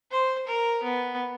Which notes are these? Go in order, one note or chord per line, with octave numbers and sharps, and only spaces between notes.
C5
A#4
B3